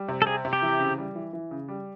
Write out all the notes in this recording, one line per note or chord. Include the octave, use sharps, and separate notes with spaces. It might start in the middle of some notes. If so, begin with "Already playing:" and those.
Already playing: G3
C3
A4
C4 G#4
C3
G4
E3
C#3
G3
E3
E3
C#3
G3